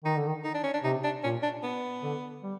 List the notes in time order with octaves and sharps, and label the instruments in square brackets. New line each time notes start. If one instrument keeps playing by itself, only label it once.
[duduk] D#3 [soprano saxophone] D#4
[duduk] D3
D#3
[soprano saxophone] D#4
D4
C#4
D4
[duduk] C3 [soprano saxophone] D#4
[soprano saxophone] D4
[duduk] A#2 [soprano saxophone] C#4
[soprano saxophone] D4
B3
[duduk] D3
G3